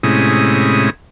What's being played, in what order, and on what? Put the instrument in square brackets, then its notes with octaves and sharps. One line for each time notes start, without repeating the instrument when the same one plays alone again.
[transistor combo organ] A2 C3 G#3 C#4 E4 D#6